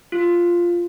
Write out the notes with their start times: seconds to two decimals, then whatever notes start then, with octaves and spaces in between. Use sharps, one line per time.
0.12 F4